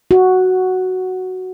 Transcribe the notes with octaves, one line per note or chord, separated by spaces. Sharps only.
F#4